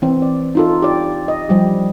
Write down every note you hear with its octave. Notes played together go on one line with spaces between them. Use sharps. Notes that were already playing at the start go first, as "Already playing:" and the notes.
E3 C4
D5
D#4 F4 A4
G4 D5
D#5
F3 G3 G4